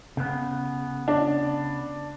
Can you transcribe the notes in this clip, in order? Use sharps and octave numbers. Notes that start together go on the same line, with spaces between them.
C#3 B3
D4